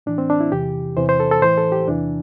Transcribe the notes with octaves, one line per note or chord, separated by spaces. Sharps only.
A2 E3 D4
C4
D4
E4
E2 C3 E3 G4
E2 C3 E3 C5
C5
A4
A4
A2 E3 C5
A4
G4
E2 C3 E3 D4